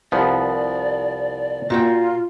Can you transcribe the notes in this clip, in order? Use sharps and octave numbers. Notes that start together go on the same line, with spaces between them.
C2 F3 B3 D5
A#2 F4 F#4 G5